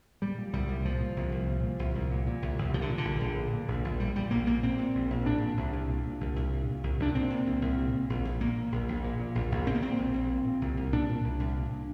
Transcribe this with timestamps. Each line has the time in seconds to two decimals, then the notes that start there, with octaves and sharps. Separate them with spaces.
0.22 A#2 G3
0.38 A#2
0.53 C2 G3
0.69 C2
0.84 A#2 F3
1.01 A#2
1.16 C2
1.32 C2
1.47 A#2
1.63 A#2
1.79 C2
1.95 C2
2.11 A#2
2.27 A#2
2.42 C2
2.58 C2
2.74 A#2 F3
2.82 D3
2.90 A#2
2.98 D3
3.05 A#1
3.21 A#1
3.37 A#2
3.53 A#2
3.68 A#1
3.84 A#1
3.99 A#2 G3
4.16 A#2 G3
4.31 A#1 A#3
4.47 A#1 A#3
4.63 A#2 C4
4.78 A#2
4.95 A#1
5.10 A#1
5.26 A#2 D4
5.42 A#2
5.57 C2
5.73 C2
5.89 A#2
6.05 A#2
6.21 C2
6.36 C2
6.52 A#2
6.68 A#2
6.83 C2
6.99 C2 D4
7.15 A#2 C4
7.30 A#2
7.47 C2
7.62 C2
7.78 A#2
7.94 A#2
8.10 A#1
8.25 A#1
8.41 A#2 A#3
8.56 A#2
8.72 A#1
8.88 A#1
9.04 A#2
9.20 A#2
9.35 A#1
9.52 A#1
9.67 A#2 C4
9.75 A#3
9.82 A#2 C4
9.98 A#1
10.14 A#1
10.30 A#2
10.46 A#2
10.61 C2
10.77 C2
10.93 A#2 D4
11.09 A#2
11.24 C2
11.40 C2
11.56 A#2
11.72 A#2